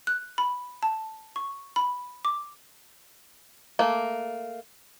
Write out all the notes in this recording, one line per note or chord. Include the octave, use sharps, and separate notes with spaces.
F#6
B5
A5
C#6
B5
D6
A3 A#3